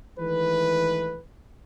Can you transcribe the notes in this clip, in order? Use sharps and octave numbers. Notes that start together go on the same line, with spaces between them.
D#3 E3 G#3 A3 B4